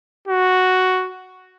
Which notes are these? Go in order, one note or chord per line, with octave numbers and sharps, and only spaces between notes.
F#4